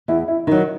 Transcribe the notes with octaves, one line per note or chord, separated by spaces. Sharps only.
E2 E4
E4
D#3 F#3 D#4